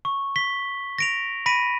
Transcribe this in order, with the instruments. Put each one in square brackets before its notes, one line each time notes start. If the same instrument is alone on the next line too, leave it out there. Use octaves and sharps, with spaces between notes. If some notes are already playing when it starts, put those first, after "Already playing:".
[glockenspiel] C#6
B6 G7
A#6 D7 F7
B5 A#6 B6 D7 D#7